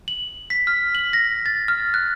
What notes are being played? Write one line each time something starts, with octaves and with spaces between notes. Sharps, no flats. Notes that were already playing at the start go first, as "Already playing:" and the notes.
F#7
B6
F6
F#7
A#6
A6
F6
F#6